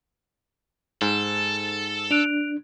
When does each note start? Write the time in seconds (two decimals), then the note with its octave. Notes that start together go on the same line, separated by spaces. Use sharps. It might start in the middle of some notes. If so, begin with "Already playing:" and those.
1.02 G#2 A4
2.11 D4 F#6 D7 F7